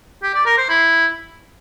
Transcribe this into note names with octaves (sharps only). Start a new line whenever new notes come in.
G4
D5
A#4
C5
E4